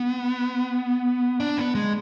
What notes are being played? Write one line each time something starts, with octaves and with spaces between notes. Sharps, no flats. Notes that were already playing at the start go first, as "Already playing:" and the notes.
Already playing: B3
D4
B3
G#3